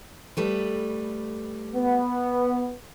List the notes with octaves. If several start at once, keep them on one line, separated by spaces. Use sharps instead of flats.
G3 A3 B4
B3